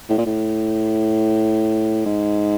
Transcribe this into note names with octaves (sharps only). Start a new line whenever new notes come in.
A2
A#2
A2
G#2